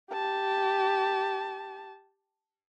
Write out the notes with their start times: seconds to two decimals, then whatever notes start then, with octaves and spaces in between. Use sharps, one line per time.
0.12 G4 A5